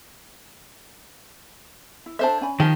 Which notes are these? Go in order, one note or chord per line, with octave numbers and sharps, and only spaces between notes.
E4
D4 A4 C5 E5 A5
C#4 G#5 B5
D#3 F3 G4